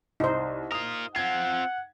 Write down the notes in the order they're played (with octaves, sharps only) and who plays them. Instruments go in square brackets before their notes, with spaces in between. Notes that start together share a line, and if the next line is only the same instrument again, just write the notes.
[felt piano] C2 [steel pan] D#4 C5
[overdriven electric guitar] F4 A#4 [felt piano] D#6
[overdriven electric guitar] C4 F4 [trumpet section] F#5 [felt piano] G#6